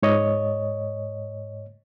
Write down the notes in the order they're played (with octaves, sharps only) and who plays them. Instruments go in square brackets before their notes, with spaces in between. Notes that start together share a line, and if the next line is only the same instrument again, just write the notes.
[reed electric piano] G#2 C#5 D#5